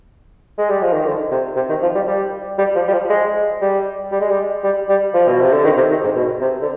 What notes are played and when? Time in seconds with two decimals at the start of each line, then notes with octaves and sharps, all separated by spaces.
0.58 G#3
0.69 G3
0.82 F3
0.93 D#3
1.06 D3
1.31 C3
1.56 C3
1.69 D#3
1.82 F3
1.95 G3
2.07 G3
2.58 G3
2.75 F3
2.87 G3
2.92 F3
3.10 G#3
3.61 G3
4.12 G3
4.20 G#3
4.30 G3
4.63 G3
4.89 G3
5.14 F3
5.28 B2
5.40 C3
5.53 D3
5.64 D#3
5.77 C3
5.90 D#3
6.03 G#2
6.16 B2
6.41 C3
6.61 D3